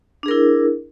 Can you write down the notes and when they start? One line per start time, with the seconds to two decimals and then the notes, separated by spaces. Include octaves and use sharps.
0.23 D4
0.26 G#4
0.28 A#4
0.31 E4